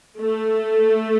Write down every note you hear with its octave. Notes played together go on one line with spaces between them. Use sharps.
A3